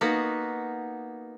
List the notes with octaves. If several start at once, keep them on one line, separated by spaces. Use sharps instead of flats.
A#3 B3 D#4 F#4